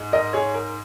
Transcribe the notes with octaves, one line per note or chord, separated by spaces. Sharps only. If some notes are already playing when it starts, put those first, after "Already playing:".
Already playing: G#2 G#3
A#4 D#5
G#4 C#5
A#4